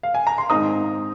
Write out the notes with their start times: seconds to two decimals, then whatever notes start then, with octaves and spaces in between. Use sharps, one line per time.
0.03 F5
0.15 G#5
0.27 A#5
0.38 C6
0.50 G#2 D#3 C4 D#4 A#5 D#6